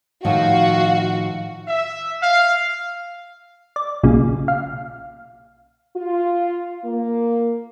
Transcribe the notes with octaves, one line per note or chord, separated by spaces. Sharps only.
A2 D#3 F3 F#4 F5
E5
F5
D5
B1 A#2 C#3
F5
F4
A#3